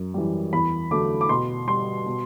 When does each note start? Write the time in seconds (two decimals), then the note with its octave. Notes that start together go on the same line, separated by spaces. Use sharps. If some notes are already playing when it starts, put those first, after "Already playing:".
Already playing: F#2
0.14 E3 G3
0.53 E2 B5
0.91 D3 F#3 A3 D6
1.21 D6
1.29 B2 C6
1.68 G3 C6
2.06 B2